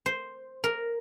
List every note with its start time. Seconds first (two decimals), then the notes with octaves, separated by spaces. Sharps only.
0.06 C5
0.64 A#4